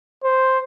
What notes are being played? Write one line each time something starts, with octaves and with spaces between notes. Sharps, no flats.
C5